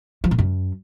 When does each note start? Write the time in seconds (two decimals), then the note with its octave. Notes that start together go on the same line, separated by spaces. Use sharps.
0.24 F3
0.31 A#2
0.39 F#2